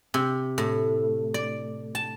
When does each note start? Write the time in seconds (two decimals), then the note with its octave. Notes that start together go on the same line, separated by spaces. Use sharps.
0.14 C3
0.58 A2
1.34 D5
1.95 A5